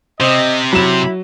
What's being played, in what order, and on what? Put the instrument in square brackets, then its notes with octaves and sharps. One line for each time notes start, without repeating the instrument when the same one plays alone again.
[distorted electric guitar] C3 [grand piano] C4 [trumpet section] D#5
[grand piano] F#3 E7 [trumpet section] E4 B5